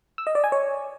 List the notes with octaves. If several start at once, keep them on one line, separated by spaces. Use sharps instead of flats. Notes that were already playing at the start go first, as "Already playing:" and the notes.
E6
D#5
D5
G#5
C#5